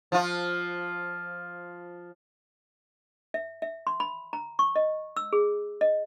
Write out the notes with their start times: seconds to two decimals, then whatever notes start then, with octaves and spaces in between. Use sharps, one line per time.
0.12 F3 F4
3.34 E5
3.62 E5
3.87 C6
4.00 B5
4.33 A#5
4.59 C#6
4.76 D#5
5.17 E6
5.33 G#4
5.81 D#5